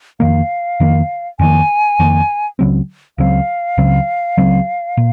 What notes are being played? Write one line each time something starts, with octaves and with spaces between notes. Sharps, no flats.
F2 D#3 A#3 F5
F2 D#3 A#3
F2 D#3 A#3 G#5
F2 D#3 A#3
C#2 C#3 F#3 C4
C#2 C#3 F#3 C4 F5
C#2 C#3 F#3 C4
C#2 C#3 F#3 C4
A#2